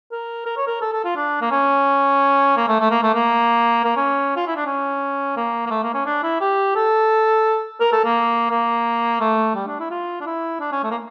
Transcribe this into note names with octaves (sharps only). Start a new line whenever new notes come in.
A#4
A#4
C#5
A#4
A4
A4
F4
D4
A#3
C#4
A#3
A3
A3
A#3
A3
A#3
A#3
C#4
F4
E4
D4
C#4
A#3
A#3
A3
A#3
C#4
D4
E4
G4
A4
A#4
A4
A#3
A#3
A3
G3
D4
E4
F4
D4
E4
D4
C#4
A3
A#3